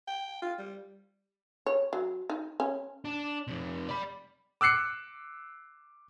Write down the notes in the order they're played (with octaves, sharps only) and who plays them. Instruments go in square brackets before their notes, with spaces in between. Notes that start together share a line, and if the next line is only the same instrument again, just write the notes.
[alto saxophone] G5
F4
G3
[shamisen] C#5
F#3
D#4
C#4
[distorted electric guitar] D4
F2 C3
D5 B5
[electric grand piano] D6 E6 F#6 C7 C#7